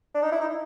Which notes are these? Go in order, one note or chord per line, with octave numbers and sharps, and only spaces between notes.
D4
D#4
E4
D#4